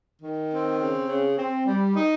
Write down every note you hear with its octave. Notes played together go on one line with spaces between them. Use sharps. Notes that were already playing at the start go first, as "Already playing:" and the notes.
D#3
C4
C#3
C#3
C4
G3
D#4